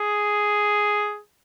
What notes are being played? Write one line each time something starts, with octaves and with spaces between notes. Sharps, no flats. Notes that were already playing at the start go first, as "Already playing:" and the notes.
Already playing: G#4